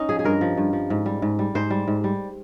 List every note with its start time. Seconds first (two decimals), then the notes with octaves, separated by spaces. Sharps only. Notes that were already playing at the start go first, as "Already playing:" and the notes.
Already playing: C#4 D#4
0.09 F3 G#4
0.19 G#4
0.24 G2 A#4
0.41 F3
0.57 G2
0.73 F3
0.90 G#2
1.06 G3
1.22 G#2
1.39 G3
1.55 G#2 C5
1.70 G3
1.88 G#2
2.04 G3